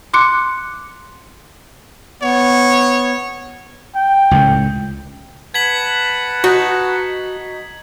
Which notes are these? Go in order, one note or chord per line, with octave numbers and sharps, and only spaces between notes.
C6 D6 F#6 C#7
B3 C#5
G5
C#2 A2
B4 F#5 A5 G#6 B6 F#7
D#4 F#4